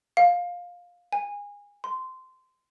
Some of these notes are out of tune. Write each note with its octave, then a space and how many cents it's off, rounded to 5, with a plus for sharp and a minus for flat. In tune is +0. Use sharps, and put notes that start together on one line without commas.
F5 +15
G#5 -25
C6 -15